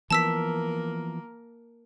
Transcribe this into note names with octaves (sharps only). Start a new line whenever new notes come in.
E3 F3 A#3 B3 A#4 A5 E6 B6